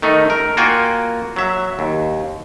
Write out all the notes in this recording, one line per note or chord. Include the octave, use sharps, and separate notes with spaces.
D#3 A3 D#4
A#4
A#3 F4 F#4 G5 G#5
F#3 E5
D#2